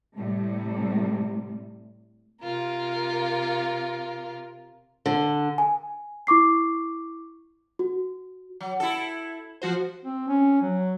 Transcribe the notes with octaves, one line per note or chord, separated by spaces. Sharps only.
A2 C3 G3 A3
C3 F4 A#4
D3
G#5
E4 C#6 D6 C7
F#4
F#3
E4 A4
F3 F#4 C5
C4
C#4
F#3